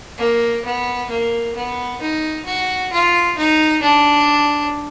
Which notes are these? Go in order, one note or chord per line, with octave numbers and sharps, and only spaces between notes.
A#3
B3
A#3
B3
D#4
F#4
F4
D#4
D4